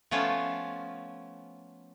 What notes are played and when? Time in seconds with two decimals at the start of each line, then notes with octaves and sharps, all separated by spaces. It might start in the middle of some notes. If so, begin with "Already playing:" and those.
0.11 F3 A3 B3 C#4 F4